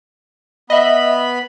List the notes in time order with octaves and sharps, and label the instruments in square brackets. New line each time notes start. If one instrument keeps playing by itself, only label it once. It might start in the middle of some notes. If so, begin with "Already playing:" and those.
[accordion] B3 B5 [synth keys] D#5 E5